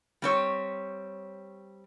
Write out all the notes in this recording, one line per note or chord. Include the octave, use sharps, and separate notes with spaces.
G3 C4 C#5